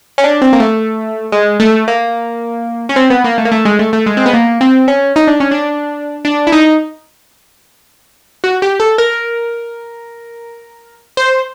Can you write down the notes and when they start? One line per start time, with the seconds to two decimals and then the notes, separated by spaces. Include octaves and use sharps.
0.18 C#4
0.24 D4
0.42 C4
0.53 A#3
0.60 A3
1.32 G#3
1.60 A3
1.88 A#3
2.89 C#4
2.96 C4
3.10 B3
3.24 A#3
3.38 A3
3.45 A#3
3.52 A3
3.65 G#3
3.79 A3
3.93 A3
4.06 G#3
4.17 C4
4.26 B3
4.33 A#3
4.61 C4
4.88 C#4
5.16 D#4
5.27 D4
5.40 C#4
5.51 D4
6.25 D4
6.47 E4
6.52 D#4
8.44 F#4
8.62 G4
8.80 A4
8.98 A#4
11.17 C5